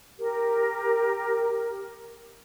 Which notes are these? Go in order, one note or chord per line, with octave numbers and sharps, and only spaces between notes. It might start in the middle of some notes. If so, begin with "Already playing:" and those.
G4 A#4